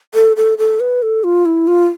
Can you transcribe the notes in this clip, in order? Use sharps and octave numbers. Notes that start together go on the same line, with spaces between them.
A4
A4
A4
B4
A4
F4
E4
F4